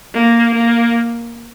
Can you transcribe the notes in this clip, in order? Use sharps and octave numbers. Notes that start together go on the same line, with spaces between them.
A#3
A#3